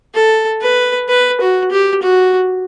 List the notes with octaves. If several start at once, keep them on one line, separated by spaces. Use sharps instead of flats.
A4
B4
B4
F#4
G4
F#4